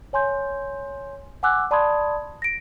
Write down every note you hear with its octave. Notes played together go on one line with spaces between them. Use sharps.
C#5 G#5 C6 G6
F#5 G#5 D6 E6 F#6
D5 A5 B5 C6 D#6 G#6
A#6 D7